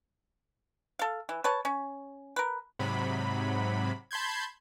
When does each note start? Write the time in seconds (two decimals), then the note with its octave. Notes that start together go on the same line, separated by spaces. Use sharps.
0.99 A4 F5
1.29 E3
1.44 B4 C#5 A5
1.65 C#4
2.36 A#4 B4
2.79 G#2 C3 F#3 B5
4.11 A5 B5 C6 G6 G#6